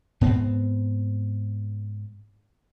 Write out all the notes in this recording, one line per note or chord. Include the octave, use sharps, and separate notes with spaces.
G#2 B3 C4